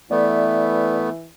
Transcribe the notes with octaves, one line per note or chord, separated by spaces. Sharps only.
E3 A3 B3 D5